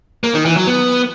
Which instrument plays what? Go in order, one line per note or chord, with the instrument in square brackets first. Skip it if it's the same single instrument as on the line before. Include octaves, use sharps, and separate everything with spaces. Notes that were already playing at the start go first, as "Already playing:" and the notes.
[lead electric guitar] A#3
D#3
E3
F#3
B3